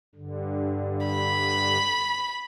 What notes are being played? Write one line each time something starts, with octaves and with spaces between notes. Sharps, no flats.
G2 D3
B5